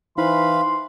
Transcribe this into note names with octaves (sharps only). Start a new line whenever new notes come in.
E3 D#4 E4 B4 C5 F5 B5 C6